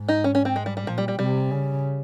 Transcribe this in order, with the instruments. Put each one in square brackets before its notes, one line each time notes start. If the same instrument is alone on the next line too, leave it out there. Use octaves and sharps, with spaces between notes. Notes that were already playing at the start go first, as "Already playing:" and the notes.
Already playing: [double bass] G#2
[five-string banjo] D#4
C#4
C#4
C4
G#3
G3
G3
[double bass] A#2 [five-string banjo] F3
[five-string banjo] G3
G3
[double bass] C3 [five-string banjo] G3
[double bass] C#3